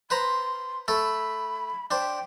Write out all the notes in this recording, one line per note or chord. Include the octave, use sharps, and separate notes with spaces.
B4 C5 A#5 C6
A3 A4 B5
D4 C5 G5